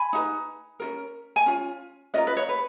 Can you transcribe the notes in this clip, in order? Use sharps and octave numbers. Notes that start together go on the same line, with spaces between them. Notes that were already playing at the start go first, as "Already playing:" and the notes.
Already playing: G#5 B5
D#4 F#4 B4
C#4 F4 A#4
G#5
C#4 F4
C#4 F4 A#4 B4 D#5
B4
C#5
B4